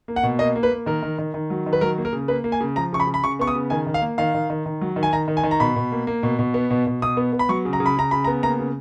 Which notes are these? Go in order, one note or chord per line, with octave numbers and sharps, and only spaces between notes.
A#3
F#5
B2
A#3 D#5
A#3
B4
A#3
D#3 A#4
D#3
D#3
D#3
F#3
D#3
B4
F#3 A#4
A#3
A#4
C#3
A#3 B4
A#3
G#5
C#3
F3 A#5
C#3 C#6
B5
C#3
B5
C#3 C#6
B3 C#6
D#6
C#3
D#3 G#5
D#3
F5
A#3
D#3 F5
D#3
D#3
D#3
F#3
D#3
G#5
D#3 A#5
D#3
G#5
D#3
A#5
B2 B5
B2
A#3
A#3
B2
B2
B3
B2
B2
B2 D#6
B3
B3
B5
F#3 C#6
C#3
A#5
C#3
B5
C#3 A#5
C#3 B5
A#5
B3
A#3 A#5
C#3